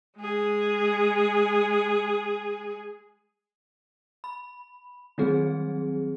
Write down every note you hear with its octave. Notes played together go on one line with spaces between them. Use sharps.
G#3 G#4
B5
D#3 F#3 G3 C4 G#4